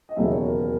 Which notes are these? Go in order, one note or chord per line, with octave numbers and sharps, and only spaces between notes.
D#5
E1 D#2 C#3 F#3 E5
C#5
A#4
A#4